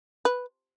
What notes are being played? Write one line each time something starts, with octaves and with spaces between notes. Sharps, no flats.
B4